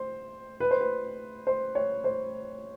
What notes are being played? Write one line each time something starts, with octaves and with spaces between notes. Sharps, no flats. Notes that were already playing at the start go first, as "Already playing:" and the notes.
Already playing: C5
B4
C5
B4
C5
C#5
C5